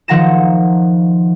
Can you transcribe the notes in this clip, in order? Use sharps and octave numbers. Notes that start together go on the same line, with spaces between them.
D#3 F3 F#5 A#5 A#6 E7